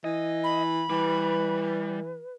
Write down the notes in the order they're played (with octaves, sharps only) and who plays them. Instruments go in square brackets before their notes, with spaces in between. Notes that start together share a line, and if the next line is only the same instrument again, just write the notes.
[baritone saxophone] E3 [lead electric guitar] D#5
[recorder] B5
[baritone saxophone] E3 [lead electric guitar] G3 [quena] B4